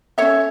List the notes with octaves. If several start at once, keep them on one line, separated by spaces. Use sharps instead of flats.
C#4 F#4 A4 C#5 E5